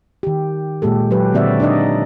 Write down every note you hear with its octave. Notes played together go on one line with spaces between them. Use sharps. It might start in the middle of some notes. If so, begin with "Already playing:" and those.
D#3 G4
A#2 G#3 G4 A4
F#3 G4 B4
A#2 D3 C4 F#4 D5 E5
D4 D#4 D5 D#5